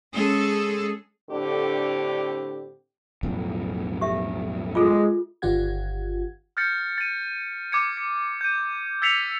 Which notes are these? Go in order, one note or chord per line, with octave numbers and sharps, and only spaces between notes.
G#3 C#4 G#4 A4
A2 D3 C4 D4 G4
B1 F2 A2
G4 E5
G#3 F4 G#4 A4
G1 D#3 F4 G4 F#5 G#6
F6 G6 A6 C#7
A6 D#7
D6 G#6 C#7
C#7
G6 D#7
E6 G#6 A6 B6 C#7 F7